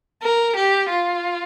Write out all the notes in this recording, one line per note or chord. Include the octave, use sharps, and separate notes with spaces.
A#4
G4
F4